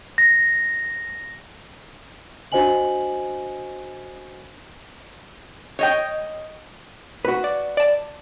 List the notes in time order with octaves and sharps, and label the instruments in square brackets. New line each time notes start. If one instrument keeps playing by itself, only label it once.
[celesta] A#6
D4 F#4 C5 D#5 G#5 F#7
[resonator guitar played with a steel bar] C#5 D#5 G5
[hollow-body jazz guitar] F#4 B4
[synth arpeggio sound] D5
D5 A5